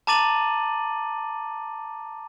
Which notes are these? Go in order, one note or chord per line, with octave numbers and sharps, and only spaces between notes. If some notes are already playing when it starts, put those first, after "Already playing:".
A5 A#5 D6 A6 D#7 F#7